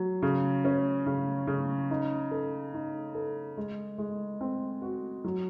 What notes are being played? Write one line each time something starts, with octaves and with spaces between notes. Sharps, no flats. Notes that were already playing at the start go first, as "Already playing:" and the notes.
Already playing: F#3
C#3
C#4
C#3
C#3
D#4
A4
D#4
A4
G#3
G#3
C4
F#4
F#3